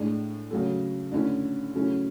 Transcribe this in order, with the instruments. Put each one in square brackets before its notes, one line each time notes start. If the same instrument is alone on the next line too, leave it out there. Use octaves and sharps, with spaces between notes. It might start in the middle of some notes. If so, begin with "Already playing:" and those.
Already playing: [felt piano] A2 G#3 D4
C#3 F#3 A3
D3 A3 C#4 E4
C#3 F#3 A3 C#4 E4